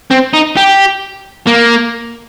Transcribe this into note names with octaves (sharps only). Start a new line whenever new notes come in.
C4
D#4
G4
A#3